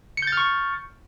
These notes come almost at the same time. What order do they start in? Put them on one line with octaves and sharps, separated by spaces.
C#7 G6 A6 F6 C#6